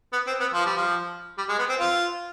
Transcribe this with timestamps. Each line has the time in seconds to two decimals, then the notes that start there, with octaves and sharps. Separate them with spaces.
0.13 B3
0.27 C4
0.40 B3
0.54 F3
0.66 G3
0.77 F3
1.38 G3
1.49 G#3
1.59 B3
1.69 C4
1.80 F4